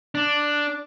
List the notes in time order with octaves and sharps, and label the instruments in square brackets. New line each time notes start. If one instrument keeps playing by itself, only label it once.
[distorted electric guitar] D4